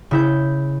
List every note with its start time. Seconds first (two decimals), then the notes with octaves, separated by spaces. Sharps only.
0.11 C#3 E4 G6